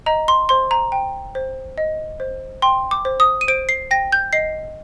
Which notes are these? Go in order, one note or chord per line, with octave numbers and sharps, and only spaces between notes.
D#5 A#5
C6
C5 C6
A#5
G5
C5
D#5
C5
G5 C6
D6
C5
D#6
D#7
C5 D7
C7
G5 A#6
G6
D#5 C7